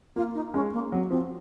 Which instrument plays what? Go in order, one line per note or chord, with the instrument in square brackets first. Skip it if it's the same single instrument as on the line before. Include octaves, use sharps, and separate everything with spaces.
[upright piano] A#3 [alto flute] F4
[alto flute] D#4
[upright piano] G#3 [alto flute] C#4
[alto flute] A#3
[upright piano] F#3 [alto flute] C4
[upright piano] F3 [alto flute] C4